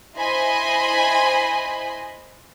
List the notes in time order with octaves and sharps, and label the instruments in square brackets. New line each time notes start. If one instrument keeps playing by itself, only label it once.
[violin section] E4 C5 D#5 G#5 B5 C6